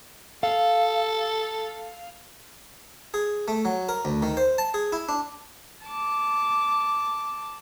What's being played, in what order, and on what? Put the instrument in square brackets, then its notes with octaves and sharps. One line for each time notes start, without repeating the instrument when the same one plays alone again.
[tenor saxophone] A4 [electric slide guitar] F5
[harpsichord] G#4
A3
F#3
A#4
D2
D#3
C5
A5
G#4
E4
D4
[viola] A5 D6